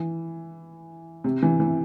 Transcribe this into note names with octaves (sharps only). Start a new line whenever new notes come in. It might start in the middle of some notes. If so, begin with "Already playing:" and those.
Already playing: E3
C3
E3
E3